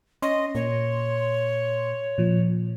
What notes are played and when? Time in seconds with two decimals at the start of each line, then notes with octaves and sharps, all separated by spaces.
0.22 C#4 D#5 C6
0.55 A#2 C#5
2.18 A#2 F3